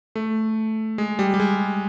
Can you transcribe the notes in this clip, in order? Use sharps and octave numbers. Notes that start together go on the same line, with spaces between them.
A3
G#3
G3
G3
G#3